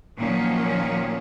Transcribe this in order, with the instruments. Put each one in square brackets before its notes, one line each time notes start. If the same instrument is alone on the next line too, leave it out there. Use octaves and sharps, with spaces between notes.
[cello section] A#2 D#3 F3 F#3 A#3 C#4